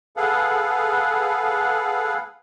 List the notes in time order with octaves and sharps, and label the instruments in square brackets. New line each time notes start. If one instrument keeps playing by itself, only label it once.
[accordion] G#4 A4 B4 F5 F#5